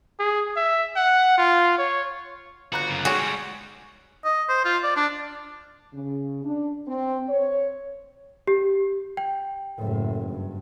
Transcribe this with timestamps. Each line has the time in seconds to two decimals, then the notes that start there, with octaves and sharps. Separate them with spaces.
0.19 G#4
0.56 E5
0.96 F#5
1.38 F4
1.78 C#5
2.72 G1 F#4 A#5 F#6
2.89 F#2 C#3
3.05 G3 G#3 F#4 G#4 C#5
4.25 D#5
4.49 C5
4.65 F4
4.83 D5
4.96 D4
5.94 C#3
6.45 D4
6.88 C4
7.29 C#5
8.47 G4
9.17 G5
9.78 F#1 A2
10.30 G2